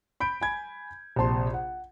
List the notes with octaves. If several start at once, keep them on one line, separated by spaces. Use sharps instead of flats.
B5 G6 D7
G#5 B5 G#6
A#1 C3 A5 C6
F#5